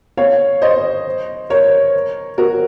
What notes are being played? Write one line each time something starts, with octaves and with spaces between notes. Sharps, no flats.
C#5 F5
C5 D#5
A#4 C#5
F#4 A#4